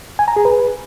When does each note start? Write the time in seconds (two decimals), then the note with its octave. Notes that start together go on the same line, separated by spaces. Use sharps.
0.19 G#5
0.28 A#5
0.36 G#4
0.45 B4